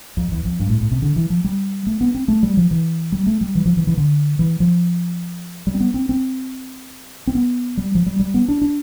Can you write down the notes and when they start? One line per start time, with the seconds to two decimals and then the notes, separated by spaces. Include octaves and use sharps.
0.17 F2
0.32 E2
0.45 F2
0.60 G2
0.69 A2
0.81 A2
0.91 C3
1.02 D3
1.16 E3
1.30 F3
1.44 G3
1.87 A3
2.01 B3
2.15 C4
2.28 A3
2.43 G3
2.57 F3
2.71 E3
3.12 G3
3.27 A3
3.41 G3
3.55 E3
3.65 F3
3.77 E3
3.87 E3
3.97 D3
4.39 E3
4.60 F3
5.67 G3
5.74 C4
5.80 B3
5.94 C4
6.09 C4
7.27 C4
7.35 B3
7.77 G3
7.95 F3
8.06 G3
8.19 G3
8.34 B3
8.48 D4
8.62 D4